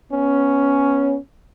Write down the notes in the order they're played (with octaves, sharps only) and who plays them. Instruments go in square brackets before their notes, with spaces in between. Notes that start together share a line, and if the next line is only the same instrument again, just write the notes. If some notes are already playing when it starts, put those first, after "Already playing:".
[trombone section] B3 C#4